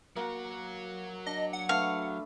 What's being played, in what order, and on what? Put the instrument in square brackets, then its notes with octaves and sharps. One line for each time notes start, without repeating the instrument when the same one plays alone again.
[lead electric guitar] F#3 F#4 [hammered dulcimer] A#3 F#5
[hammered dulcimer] D4 [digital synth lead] D#5
[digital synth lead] F#5
[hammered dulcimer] A3 D4 B4 [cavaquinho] F5